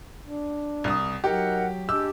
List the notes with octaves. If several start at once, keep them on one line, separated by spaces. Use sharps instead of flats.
D4
C2 D#6
F#3 D#4 G4 A#4 F#5
G#3 D4 G4 E6